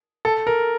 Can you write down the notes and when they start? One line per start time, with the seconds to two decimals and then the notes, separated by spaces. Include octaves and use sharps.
0.25 A4
0.47 A#4